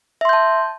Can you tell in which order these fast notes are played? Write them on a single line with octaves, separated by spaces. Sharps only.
E5 C6 G6 A5